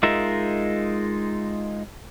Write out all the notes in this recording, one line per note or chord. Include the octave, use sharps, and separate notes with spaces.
G#3 D#4 F4 A#4 E5